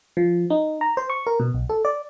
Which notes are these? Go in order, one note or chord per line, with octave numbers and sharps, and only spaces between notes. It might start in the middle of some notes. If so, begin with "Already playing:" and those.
F3
D#4
A#5
C5
C#6
A#4
B2
B1
A4
D5